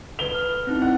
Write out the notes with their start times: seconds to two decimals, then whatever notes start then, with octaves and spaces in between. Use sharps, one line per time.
0.19 A4 B4 F7 G7
0.34 F6
0.67 C4 D#4 E4
0.82 F#5